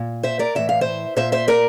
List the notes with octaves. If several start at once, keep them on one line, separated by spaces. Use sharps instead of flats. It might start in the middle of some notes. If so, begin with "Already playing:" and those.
Already playing: A#2
C5 E5
A#4 D5
A2 E3 E5
F5
C5 E5
A#2 C5 E5
C5 E5
A#4 D5